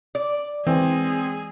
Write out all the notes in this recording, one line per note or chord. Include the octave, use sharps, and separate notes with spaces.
D5
E3 G#3 C4 G#4